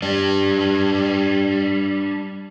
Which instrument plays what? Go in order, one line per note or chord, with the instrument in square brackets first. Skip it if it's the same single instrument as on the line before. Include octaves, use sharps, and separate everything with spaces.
[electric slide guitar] G3 D4